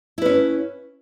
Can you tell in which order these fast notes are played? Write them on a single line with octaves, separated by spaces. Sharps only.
E4 B4 C#4